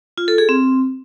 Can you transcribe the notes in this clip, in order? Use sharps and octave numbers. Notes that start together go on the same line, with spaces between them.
F4
A4
G#4
C4